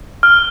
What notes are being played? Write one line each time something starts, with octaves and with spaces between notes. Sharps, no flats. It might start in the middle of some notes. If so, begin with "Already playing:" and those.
F6